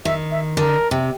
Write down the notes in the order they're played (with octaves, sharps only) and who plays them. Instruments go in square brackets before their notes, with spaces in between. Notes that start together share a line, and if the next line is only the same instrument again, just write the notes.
[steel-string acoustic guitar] D#3 [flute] E5
[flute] E5
[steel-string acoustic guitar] D3 [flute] A#4
[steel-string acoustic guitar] C3